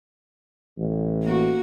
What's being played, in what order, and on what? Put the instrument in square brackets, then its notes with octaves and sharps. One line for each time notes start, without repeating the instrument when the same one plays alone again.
[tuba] A1
[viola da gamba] A#3 F#4